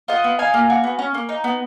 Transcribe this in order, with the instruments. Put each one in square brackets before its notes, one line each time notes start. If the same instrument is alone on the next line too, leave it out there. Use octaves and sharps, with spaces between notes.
[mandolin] F4 D#5 F#5
B3
D#4 F5 G#5
A#3
F#4
B3
C#4
A#3
D#4
B3